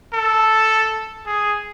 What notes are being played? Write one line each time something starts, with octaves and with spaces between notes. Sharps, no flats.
A4
G#4